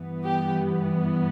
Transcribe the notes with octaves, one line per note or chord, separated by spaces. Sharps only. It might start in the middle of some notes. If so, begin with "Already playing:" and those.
Already playing: G2 E3 B3
G4